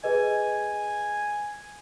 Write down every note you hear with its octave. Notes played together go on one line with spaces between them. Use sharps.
G#4 B4 D#5 G#5